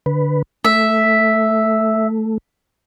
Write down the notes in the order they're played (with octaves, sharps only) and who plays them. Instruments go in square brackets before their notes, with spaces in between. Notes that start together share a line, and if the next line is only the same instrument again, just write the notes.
[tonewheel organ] D3 B4
[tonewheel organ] A3 [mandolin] E5